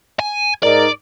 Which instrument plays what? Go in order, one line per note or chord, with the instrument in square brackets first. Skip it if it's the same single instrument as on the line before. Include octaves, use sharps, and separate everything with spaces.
[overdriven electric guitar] G#5
[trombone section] G#2 D#4 A#4 [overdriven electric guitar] D5